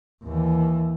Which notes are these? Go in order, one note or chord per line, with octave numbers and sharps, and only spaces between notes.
D#2 E3